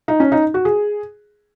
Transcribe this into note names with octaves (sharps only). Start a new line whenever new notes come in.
D#4
C#4
D#4
F#4
G#4